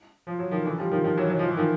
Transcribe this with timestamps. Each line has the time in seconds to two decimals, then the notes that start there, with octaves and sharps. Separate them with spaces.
0.27 F3
0.39 F#3
0.51 D#3 F3
0.65 D3 E3
0.78 F3 G3
0.91 D#3 F3
1.04 D#3 F3
1.17 E3 F#3
1.30 F#3
1.39 F3
1.48 E3
1.57 D#3 F3